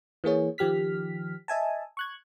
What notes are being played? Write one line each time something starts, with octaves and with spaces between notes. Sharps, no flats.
E3 A#3 G#4 C#5
D#3 F3 G4 F6 B6
D#5 E5 G#5 A5
C#6 F#6 G#6